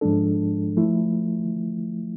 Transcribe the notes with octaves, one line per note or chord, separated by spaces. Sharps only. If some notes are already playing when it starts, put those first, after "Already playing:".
G#2 F3 G#3 D4 A4
F3 A3 E4